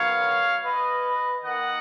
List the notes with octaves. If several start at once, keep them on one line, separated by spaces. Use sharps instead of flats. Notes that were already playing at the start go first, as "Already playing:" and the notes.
Already playing: D#3 F#3 B3 C#5 F5
B4 D#5
D#3 A#3 D#4 D#5 F#5